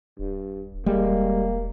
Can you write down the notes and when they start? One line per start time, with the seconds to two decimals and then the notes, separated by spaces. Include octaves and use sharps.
0.19 D#1 G2
0.86 E1 G3 G#3 A#3